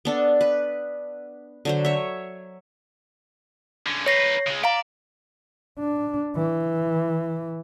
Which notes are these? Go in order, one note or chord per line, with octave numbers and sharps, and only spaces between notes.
B3 D4 A4
B4
D3 F#3 C5
C#5 E5
D3 C#4
D#4 B4 C#5 A#6 C7
C#3 G#3
D5 F5 A#5
D4
E3